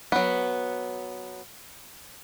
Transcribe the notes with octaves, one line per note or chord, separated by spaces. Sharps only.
F#3 B3